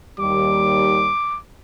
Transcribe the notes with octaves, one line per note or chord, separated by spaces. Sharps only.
D#2 G3 D6